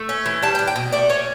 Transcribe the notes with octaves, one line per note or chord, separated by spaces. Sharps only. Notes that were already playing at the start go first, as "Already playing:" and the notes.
Already playing: A3
C#4
E3
G3 A5
G5
D4
G5
B2
A3 D5
C#4 C#5